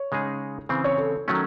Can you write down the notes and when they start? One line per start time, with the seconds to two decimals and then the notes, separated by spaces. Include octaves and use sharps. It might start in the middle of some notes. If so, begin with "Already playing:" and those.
Already playing: C#5
0.12 C#3 G#3 D#4 G#4
0.69 C#3 E3 C4
0.84 C#5
0.98 A4
1.28 D#3 F#3 A3 C#4